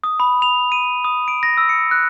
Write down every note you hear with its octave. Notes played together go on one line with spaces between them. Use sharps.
D#6
B5
F7
D#7
D#6
D7
A#6
E6
C#7
F#6